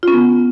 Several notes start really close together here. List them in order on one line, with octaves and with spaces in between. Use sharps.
F4 C#4 B3